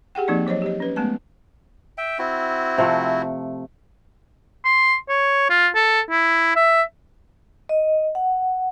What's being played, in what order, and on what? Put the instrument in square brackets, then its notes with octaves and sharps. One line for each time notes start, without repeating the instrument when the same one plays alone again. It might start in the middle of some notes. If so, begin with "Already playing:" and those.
[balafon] G4 G#4 F#5 G5
F3 A#3 C4 D#4 D5
F#3 C5 C#5 D#5
G4 D#5
C#4 B4
G#3 A3 B3 A5
[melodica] E5 G5
C4 E4 F#4
[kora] C3 F3 A3
[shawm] C6
C#5
F4
A4
E4
E5
[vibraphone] D#5
F#5